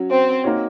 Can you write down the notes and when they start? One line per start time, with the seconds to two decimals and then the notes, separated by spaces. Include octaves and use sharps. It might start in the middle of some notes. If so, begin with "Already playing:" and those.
Already playing: F#3 C#4 F#4 C#5
0.11 C4
0.44 A#3 D#4 F#4 C#5